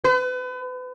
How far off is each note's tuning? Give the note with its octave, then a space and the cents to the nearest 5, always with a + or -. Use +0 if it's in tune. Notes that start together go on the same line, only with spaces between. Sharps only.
B4 +35